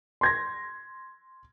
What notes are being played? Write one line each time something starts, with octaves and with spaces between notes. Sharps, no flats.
C6 G#6 A#6